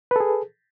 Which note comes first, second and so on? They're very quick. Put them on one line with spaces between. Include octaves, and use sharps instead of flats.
B4 A4 G#4